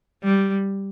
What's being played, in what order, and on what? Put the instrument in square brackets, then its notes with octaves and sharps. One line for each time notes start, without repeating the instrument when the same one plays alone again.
[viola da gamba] G3